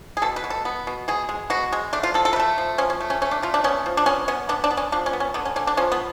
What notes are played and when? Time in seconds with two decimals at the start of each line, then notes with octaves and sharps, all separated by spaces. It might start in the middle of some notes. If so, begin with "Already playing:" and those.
0.17 G#4
0.22 B2 A4
0.36 B4
0.44 B2
0.50 A4
0.65 B3
0.87 B2
1.08 B2 G#4
1.29 G#3
1.50 B2 F#4
1.73 G#3
1.93 A3 D4
2.03 F4
2.14 F3 A4
2.25 A4
2.33 B4
2.36 A3 A4
2.58 F3
2.78 F3 C#4
2.90 C#4
3.01 A3
3.10 C#4
3.22 A3 C#4
3.31 D4
3.42 A3 F4
3.54 D4
3.64 B3 C#4
3.86 F3
3.97 D4
4.06 B3 C#4
4.28 B3 C#4
4.49 B3 D4
4.64 D4
4.71 B3
4.77 C#4
4.92 F3 D4
5.06 C#4
5.13 B3
5.20 C#4
5.34 D3 B3
5.45 C#4
5.56 D3 C#4
5.67 D4
5.77 F3 C#4
5.92 B3